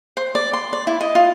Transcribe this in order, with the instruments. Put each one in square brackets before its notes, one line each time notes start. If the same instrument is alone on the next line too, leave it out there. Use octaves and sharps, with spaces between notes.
[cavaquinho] C5
D5
C6
D5
E4
D#5
F4